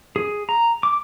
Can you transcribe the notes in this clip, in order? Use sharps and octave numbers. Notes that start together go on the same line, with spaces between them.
G#4
A#5
D6